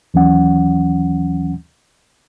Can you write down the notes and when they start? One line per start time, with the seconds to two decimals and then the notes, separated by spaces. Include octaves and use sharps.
0.14 D#2 E3 F#3 C#4 F#5